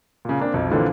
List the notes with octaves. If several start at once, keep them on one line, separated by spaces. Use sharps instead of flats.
A#2 C#3
A#3 C4 D4
B1 F2
A#2 D3 E3 F3 C4